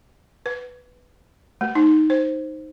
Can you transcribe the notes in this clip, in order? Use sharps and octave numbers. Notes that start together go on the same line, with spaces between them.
B4
A3
D#4
C5